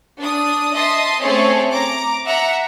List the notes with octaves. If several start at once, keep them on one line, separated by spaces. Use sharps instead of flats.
D4 D#6
D#5 E5 A5 C6 D#6
A3 C4 C#4 G#4 A4 C#5
A#5 D6
E5 F#5 A#5